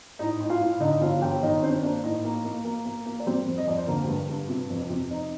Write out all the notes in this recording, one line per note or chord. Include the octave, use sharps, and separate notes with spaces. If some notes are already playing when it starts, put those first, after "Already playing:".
A2 D#4 D#5
A2
F4 F5
A2
D3 D#4 D#5
G1 F4 F5
G1 G4 G5
D#3 D#4 D#5
C4 D4 C5
A#3 D4 D5
A2 D#4 D#5
A#3
A#3
A#3
A#3
A#3
D5
G3 C4 C5
F2
D#5
F2 D5
C5
D3 A#3 A#4
G4
G2
G2
C3
F2
C3
D#4